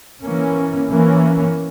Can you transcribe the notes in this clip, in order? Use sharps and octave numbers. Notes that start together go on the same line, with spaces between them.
E3 A#3 C#4
E3 A#3 C#4